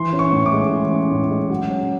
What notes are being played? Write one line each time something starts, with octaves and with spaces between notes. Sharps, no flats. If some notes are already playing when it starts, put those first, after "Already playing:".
Already playing: E3 C6
C#4
C#6
A2
D6
G#3
E3
C#4
A2
G#3
F#3
C#4